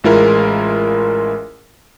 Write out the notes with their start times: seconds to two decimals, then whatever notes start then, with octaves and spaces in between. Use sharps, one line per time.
0.04 A1 G#3 E4 F4 A#4